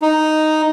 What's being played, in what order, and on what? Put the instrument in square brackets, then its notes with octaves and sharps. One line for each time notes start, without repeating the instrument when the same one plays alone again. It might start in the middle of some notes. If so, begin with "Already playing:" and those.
[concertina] D#4